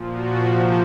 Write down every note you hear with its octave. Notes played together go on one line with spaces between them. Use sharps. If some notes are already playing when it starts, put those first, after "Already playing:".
Already playing: A#2 F3
F#4
C3 F3 F4